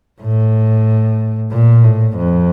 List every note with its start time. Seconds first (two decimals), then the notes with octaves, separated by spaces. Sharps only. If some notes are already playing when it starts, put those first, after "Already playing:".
0.21 A2
1.51 A#2
1.84 A2
2.16 F2